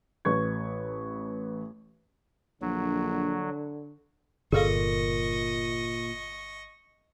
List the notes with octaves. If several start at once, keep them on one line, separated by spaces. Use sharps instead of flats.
A1 B4 C#6 G#6
A#1 D3 F#3
G1 A#2 G#4 A4 D#5 F5 C#6